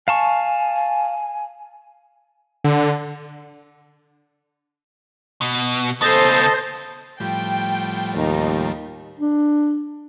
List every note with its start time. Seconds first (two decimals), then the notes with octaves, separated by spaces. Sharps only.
0.08 F5 G#5 A5 C#6
2.64 D3
5.41 B2
6.02 C#3 B3 A4 C5 D#5 A5
7.20 A2 F3 G3 G5
8.16 D#2 D#4
9.20 D4